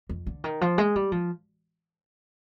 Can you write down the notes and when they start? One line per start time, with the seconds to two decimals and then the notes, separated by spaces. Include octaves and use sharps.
0.09 F2
0.27 D3
0.44 D#3
0.61 F3
0.78 G#3
0.96 G3
1.12 F3